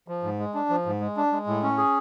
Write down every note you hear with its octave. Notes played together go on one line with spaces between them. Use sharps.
F3
G#2
G#3
D4
F3
G#2
G#3
D4
G#3
A2
C#4
G#4